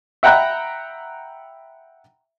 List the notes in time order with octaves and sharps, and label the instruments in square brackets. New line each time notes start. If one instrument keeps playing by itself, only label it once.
[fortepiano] E5 F#5 G5 A#5 B5 F#6